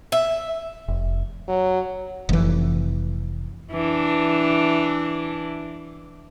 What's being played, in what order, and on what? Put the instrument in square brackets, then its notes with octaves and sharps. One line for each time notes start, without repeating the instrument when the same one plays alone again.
[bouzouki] E5
[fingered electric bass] F1
[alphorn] F#3
[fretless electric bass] F1 E3
[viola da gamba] E3 D4